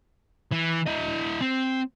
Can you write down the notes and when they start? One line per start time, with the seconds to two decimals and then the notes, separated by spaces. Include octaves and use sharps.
0.51 E3
0.86 E4 D#5
1.41 C4